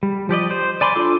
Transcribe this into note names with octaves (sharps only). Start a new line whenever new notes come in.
G3
F3 G4 D5 D#5
C5
D5 G#5 B5 C6 D6
D4 F4 A4 D6